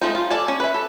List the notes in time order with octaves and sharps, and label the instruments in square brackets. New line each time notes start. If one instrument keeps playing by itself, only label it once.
[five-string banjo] F3 G#3 A3 C4 D#4
F4
A4 D5 G#5
C#4
B4 E5
A4